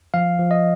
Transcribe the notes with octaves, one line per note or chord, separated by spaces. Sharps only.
F3 F5
F3
D#5